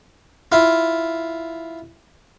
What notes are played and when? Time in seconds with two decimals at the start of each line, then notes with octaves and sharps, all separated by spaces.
0.52 E4 F4